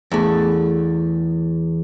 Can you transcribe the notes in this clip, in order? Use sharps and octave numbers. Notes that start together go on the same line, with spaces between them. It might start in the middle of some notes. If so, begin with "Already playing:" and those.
E2 A3